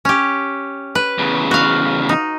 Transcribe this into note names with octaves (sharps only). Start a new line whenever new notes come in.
C#4 G4
B4
E2 C#3
F#4 F5
D#4